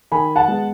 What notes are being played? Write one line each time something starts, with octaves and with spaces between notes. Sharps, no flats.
D#3 G#5 B5
F#5 A5
G#3 B3